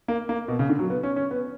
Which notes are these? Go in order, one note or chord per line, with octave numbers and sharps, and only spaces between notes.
A#3
A#3
B2
C#3
D3
F#3
B3
C#4
C#4
B3